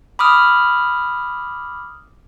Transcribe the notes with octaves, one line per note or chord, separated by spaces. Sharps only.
B5 D6 D#6 F6